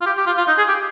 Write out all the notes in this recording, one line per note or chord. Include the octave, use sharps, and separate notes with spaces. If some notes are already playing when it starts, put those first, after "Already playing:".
F4
G4
G4
F4
F4
D#4
G#4
G4